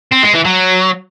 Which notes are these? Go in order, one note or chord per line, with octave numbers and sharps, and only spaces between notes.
C4
G#3
E3
F#3